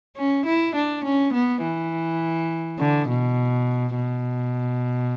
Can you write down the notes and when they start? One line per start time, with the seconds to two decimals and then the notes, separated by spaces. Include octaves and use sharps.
0.17 C#4
0.46 E4
0.75 D4
1.04 C#4
1.33 B3
1.63 E3
2.79 D3
3.08 B2
3.95 B2